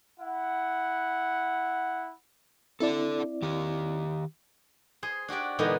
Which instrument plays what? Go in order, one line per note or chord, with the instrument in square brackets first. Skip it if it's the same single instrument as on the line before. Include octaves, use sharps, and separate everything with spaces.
[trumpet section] E4 F#5
[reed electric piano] C4 E4 D5 [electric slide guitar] D4 A4
[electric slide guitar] D#3 G4
[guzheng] G#4 C5
D4 F#4 G4 D5
A#2 D3 E3 G#3 B3 D#4